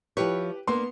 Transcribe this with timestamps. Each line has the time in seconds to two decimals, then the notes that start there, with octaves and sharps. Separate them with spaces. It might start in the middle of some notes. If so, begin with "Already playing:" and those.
0.17 F3 E4 G4 B4 C#5
0.67 A#3 B3 D4 C6